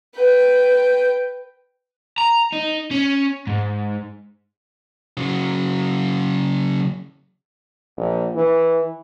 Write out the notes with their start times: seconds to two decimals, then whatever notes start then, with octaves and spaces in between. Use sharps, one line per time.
0.15 B4 G5
2.18 A#5
2.53 D#4
2.91 C#4
3.47 G#2
5.17 C#3 F#3
7.97 A#1
8.35 E3